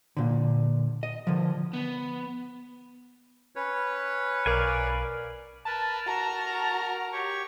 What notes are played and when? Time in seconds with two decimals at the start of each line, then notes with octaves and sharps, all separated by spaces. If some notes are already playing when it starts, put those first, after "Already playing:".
0.17 A#2 D3
1.03 D#5
1.27 D3 F3
1.73 B3
3.56 C#4 B4 C#5
4.46 B1 A#4 D5 F5 G#5
5.65 A#4 B4 A5
6.06 F#4 A#4 A#5
7.12 G4 C#5 C#6